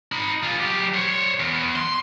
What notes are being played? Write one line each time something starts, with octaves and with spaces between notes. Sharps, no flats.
D#4 B5
F4 G#4
F#3 G4
C5 C#5
E2
C6